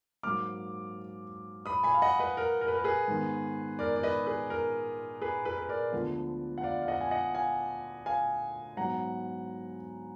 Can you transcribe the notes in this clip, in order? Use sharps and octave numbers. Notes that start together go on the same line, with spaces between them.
G#2 F#3 A#3 D6 F6
B5 D#6
G#5 B5
F5
D#5 F#5
B4 D#5
A#4
A#4
B4
A#4
G#4 B4
G#2 D#3 G#3 B3
A#4 D5
D5
B4 D#5
G#4 B4
A#4
G#4 B4
G#4 B4
B4
A#4 D5
D2 D3 F3 G#3 B3
F#5
D5 F5
F5
D#5 F#5
G#5
D#5 F#5
F5 G#5
F5 G#5
G#2 F#3 B3 F#5 A#5